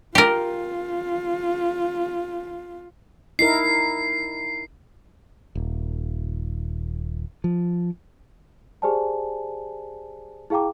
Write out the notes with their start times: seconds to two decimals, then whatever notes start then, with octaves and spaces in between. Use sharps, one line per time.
0.15 F4 G4 A#4
3.39 D#4 E4 A#4 C7
5.55 D#1
7.44 F3
8.82 G4 G#4 C5 D5 G#5 A5
10.50 E4 G#4 F5 G5 A#5 D6